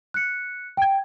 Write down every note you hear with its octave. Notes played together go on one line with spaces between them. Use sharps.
F#6 C#7
G5 G#6